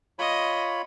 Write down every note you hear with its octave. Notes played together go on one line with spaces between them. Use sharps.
F4 C#5 D#5 B5